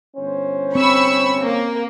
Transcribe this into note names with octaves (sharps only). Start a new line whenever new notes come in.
G1 C#4 C5
C4 B5 C#6 E6
A#3